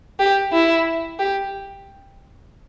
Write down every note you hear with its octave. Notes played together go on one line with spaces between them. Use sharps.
G4
E4
G4